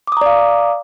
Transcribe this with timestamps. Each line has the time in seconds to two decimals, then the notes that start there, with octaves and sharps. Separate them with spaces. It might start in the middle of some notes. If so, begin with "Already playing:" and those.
0.07 D6
0.12 D#6
0.17 A#5
0.21 D5
0.26 F5